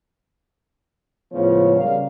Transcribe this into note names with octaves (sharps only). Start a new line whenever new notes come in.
C#2 A2 C#3 F3 B3 C#5
C#3 G3 A#4 D5 F5